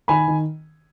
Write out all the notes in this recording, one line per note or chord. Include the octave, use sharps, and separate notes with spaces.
D#3 G#5 B5
D#3